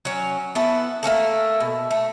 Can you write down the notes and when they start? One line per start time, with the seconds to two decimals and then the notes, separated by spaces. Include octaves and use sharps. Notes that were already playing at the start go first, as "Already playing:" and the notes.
0.05 F#3 C#4
0.55 B3 E4 F#4 A4
1.03 A3 A#3 C#4 A4
1.60 B2
1.91 A3